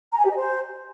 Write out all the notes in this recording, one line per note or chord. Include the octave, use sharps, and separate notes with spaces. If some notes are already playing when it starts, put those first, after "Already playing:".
A#5
G#5
G4
D#5
C5